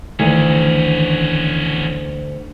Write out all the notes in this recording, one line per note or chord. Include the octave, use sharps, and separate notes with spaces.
D2 D#3 E3 B3 C#4